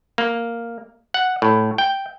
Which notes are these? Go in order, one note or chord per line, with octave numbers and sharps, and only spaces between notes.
A#3
F#5
A2
G5